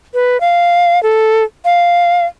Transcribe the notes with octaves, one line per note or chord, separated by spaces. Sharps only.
B4
F5
A4
F5